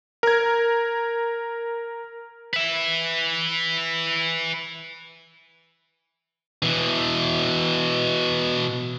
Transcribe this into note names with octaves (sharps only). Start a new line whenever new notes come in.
A#4 G#6
B4 E5
B2 E3